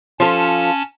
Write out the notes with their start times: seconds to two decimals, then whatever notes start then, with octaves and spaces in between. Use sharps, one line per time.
0.20 F3 C#4 F4 A4 A5